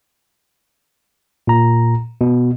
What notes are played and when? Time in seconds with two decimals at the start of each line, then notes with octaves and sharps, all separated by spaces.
1.47 A#2 A#5
2.21 B2